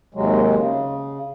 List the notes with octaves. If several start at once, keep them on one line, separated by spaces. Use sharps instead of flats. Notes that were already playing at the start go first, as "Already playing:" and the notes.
D#2 C3 F#3 G#3
C#3